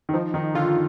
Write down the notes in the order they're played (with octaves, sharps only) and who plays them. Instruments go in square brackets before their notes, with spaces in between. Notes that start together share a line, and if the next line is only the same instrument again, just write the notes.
[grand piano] D#3
[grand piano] F3 [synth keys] D#4
[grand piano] D#3 [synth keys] D#4
[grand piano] D3 [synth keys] F4